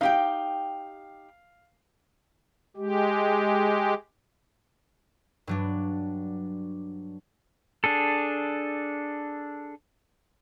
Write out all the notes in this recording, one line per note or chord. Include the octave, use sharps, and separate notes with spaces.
D#4 G4 F5 G5
G#3 G4
G2 F#3 D4
D4 G#4 A4